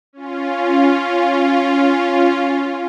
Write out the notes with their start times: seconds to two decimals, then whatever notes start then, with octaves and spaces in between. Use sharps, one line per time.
0.13 C#4 F4